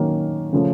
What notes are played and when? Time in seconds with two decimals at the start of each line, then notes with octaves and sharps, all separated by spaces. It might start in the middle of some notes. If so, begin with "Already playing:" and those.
Already playing: D#3 F#3 A#3 C#4
0.53 C#3 F3 A3 C#4